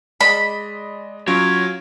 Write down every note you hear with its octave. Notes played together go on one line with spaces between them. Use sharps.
G#3 D5 D#5 B5
F#3 C#4 F4 C#5 D7